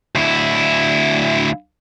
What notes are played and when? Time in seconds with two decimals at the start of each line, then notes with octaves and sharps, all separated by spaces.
0.15 D2 E4